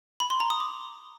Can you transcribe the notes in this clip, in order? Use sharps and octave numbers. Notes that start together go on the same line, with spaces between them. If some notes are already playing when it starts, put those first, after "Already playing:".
B5
C6
A#5
D#6
D6